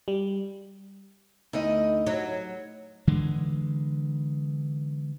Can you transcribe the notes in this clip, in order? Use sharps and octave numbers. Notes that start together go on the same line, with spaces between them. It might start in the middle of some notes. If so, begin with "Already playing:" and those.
G3
D2 D#4 E4 D#5
F#3
D3 E3 G#3